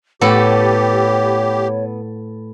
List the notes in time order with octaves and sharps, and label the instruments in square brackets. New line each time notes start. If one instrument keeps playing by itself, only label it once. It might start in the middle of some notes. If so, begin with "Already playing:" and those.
[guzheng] A2 A4 [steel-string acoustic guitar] B3 [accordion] G4 [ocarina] C#5